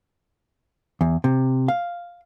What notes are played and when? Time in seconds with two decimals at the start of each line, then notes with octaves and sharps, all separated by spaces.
1.01 E2
1.24 C3
1.68 F5